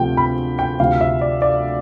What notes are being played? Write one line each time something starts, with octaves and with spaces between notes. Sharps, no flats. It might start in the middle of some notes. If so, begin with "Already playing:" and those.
Already playing: D2 C3 F3 A3 C4 G5
B5
G5
D2 C3 F3 F5
E5
D5
D5